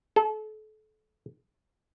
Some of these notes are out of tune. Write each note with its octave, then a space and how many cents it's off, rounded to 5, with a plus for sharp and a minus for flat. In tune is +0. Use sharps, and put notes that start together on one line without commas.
A4 -35